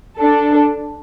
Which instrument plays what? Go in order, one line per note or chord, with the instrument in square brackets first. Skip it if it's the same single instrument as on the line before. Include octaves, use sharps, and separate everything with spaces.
[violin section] D4 A4